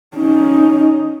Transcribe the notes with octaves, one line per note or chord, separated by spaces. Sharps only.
C#4 D#4